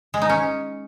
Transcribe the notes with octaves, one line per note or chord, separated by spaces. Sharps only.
G#3
D#4
C#4